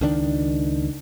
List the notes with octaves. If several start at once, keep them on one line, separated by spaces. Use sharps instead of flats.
C#2 D#3 D4